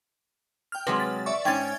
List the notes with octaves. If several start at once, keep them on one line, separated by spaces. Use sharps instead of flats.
G5 F6
C3 F#3 G#3 B4
A6
D5 E5 C#6
G#2 C#4 G5 G#6 A6